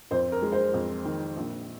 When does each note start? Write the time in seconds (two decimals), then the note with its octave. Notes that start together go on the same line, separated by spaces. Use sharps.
0.11 F2 C5
0.32 A#4
0.42 G#3
0.52 C5
0.74 F2
1.05 D#3
1.37 A#1